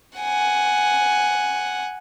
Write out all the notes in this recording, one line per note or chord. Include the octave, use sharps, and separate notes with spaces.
F#5 G#5